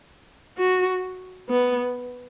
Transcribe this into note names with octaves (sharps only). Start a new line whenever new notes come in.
F#4
B3